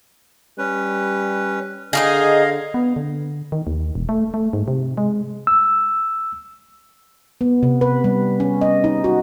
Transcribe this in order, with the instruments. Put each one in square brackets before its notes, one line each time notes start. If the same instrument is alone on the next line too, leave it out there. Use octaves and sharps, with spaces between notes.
[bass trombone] G3 [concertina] C#4 B4
[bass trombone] D3 [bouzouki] D#4 E4 G#4 [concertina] D#5 F5
[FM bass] B3
D3
D#3
D#2
E1
A3
A3
G#2
C3
G#3
[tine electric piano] E6
[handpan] B3
C3
B4
G3
C#4
D#5
D#4
F#4